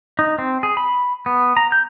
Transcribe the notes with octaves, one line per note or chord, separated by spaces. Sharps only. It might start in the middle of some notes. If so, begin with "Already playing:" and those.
D#4
C4
G#4
B5
B3
A#5
G6